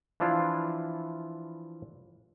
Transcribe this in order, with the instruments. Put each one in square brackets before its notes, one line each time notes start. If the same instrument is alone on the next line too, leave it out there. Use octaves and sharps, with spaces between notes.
[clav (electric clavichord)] E3 F3 D4 E4 F4